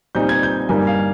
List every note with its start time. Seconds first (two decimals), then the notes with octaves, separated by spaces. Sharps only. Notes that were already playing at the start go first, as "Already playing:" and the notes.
0.15 A#2 G3 C4 D#4 G6
0.29 G#6
0.43 G6
0.69 G2 G3 A#3 D#4 G#5
0.87 F5